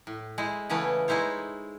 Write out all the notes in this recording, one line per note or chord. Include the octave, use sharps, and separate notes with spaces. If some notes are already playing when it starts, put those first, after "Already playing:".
A2
G#3 E4 C5
C#3 E3 A3 B3 C#4
G#3 D#4 E4 C5 C#5